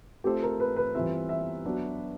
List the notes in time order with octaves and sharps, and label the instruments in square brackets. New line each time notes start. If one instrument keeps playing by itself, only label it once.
[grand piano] A3 C4 F4 A4 C5 [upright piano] G4
[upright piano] A#4
B4
B4
[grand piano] E3 G3 C4 F4 [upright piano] E5
[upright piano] E5
[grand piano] F#3 B3 D4 F#4